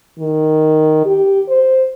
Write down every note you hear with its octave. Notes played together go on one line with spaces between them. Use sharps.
D#3
G4
C5